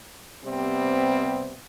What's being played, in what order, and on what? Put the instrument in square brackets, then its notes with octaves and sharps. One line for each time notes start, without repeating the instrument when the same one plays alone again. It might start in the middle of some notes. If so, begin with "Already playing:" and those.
[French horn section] C3 G3 B3 C4